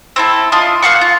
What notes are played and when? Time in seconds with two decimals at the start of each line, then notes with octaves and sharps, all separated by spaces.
0.16 C4 E4 A4
0.52 D4 F4 D#5
0.82 A#3 F5 F#5 C#6
1.01 F4